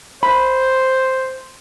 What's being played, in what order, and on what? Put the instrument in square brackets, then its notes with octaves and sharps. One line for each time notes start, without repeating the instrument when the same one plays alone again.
[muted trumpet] C5 [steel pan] B5